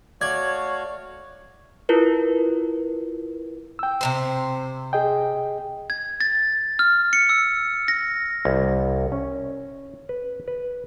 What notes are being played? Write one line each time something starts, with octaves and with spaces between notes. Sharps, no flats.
A3 F#4 C#5 D5 F5 G#6
E4 F4 A#4 B4
G5 E6
C3 F#3 C5
G#4 D#5 G5
G#6
A6
F6
C#7
E6
A#6
C2
C#4
B4
B4